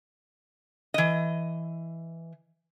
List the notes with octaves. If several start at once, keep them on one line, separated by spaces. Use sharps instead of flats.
E3 D#5